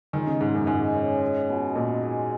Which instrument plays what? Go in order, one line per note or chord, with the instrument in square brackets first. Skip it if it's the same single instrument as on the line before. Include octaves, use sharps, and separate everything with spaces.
[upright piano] D#3 [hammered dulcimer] G#3
[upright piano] C#3
[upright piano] G#2 [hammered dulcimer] G#3
[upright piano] F#2
[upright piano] G#2 [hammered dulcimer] G#3
[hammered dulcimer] C#4
G#4
B2
[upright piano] A#2 [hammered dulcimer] D#4
[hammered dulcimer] G#4